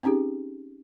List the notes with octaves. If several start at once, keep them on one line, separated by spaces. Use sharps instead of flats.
C4 C#4 D#4 G4 G#4